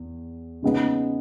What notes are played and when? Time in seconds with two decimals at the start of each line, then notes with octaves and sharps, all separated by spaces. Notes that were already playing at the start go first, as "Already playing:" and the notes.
Already playing: E2
0.62 C#3 G#3 B3 D#4